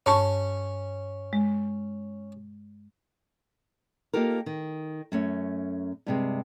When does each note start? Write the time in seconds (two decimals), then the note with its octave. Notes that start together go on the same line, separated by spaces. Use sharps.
0.06 G2 C#4 A5 C#6
1.33 G#3
4.14 A#3 D#4 F4 G4 A4 A#4
4.46 D#3
5.12 F#2 A3 C#4
6.06 G2 C3 G#3